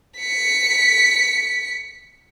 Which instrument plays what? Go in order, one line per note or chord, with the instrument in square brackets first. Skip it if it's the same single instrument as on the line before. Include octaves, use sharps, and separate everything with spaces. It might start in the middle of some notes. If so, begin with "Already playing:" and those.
[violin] B6 C#7